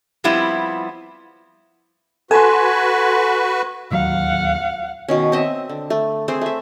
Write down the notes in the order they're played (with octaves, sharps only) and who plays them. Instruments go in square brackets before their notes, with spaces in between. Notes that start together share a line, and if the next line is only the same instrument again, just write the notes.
[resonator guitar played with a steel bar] F3 G3 B3 C4 E4
[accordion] F#4 B4 [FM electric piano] A4 [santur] G#5 C6
[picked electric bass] D1 D#2 F#3 [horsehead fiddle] F5 F#5
[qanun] B2 D#3 C#4
C4 D#5 E5
D3
A3
A3 C4 G#4 C5
A3 E5